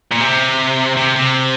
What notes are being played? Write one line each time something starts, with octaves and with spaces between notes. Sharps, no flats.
A#2
C3
C3
C3